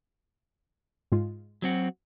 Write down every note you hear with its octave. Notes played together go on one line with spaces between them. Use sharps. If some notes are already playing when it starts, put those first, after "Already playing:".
G#2 G#3 F4
F#3 C4 F#4